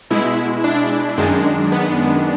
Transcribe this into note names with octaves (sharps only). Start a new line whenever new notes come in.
B2 G#3 E4
D4
F#2 D#3 G#3
B3